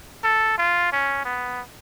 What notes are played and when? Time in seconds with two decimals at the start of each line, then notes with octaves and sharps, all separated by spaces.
0.24 A4
0.58 F4
0.92 C#4
1.25 B3